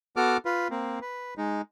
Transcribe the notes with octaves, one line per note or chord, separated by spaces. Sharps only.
B3 F#4 A4 D6 F6
F4 B4
A#3 C4
B4
G#3 D#4